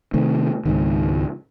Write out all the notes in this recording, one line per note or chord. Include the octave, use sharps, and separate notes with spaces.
C3 D#3 A3
C#2 G#2 D#3